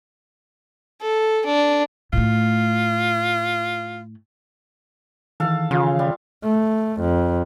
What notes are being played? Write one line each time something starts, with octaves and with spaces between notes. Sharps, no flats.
A4
D4
A2 A3 F4
D#3 E3 A4 F5
C#3 F4
G3
A3
F2